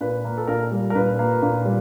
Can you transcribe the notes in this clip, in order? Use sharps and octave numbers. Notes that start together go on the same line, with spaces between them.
A#2 B4
A#3
A4
A#2 A#4
G3
A#4
A#2 B4
A#3
A#2
G3